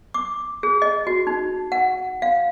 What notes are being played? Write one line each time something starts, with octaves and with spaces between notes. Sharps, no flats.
D6
G#4
D#5
F#4
D#4
F#5
F5